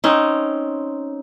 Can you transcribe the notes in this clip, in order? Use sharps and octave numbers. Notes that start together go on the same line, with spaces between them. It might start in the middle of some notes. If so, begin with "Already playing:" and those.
C4 C#4 D#4